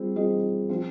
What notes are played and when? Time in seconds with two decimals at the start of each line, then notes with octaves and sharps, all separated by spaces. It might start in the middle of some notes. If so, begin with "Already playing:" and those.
Already playing: G3 C4 F4 G#4
0.16 G3 C4 F4 G#4 D#5
0.69 F3 C4 F4